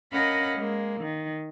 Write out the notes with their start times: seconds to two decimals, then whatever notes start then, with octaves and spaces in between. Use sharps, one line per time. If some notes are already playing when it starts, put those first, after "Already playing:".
0.13 C#4 A#4 D#5 F5 F#5 B5
0.57 G#3 A#3
1.00 D#3